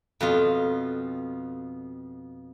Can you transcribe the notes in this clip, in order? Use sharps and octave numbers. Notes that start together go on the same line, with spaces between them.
F2 B2 F4